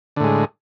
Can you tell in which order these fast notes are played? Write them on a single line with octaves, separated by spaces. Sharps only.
D3 A2 G#3